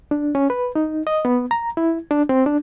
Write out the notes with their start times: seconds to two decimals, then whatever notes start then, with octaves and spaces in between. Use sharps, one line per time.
0.11 D4
0.35 C#4
0.50 B4
0.75 D#4
1.07 D#5
1.25 B3
1.51 A#5
1.77 E4
2.11 D4
2.29 C4
2.46 D4